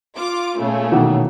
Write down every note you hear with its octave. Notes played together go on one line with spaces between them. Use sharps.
F4 D6
A#2 C#3 A3
B2 D#3 E3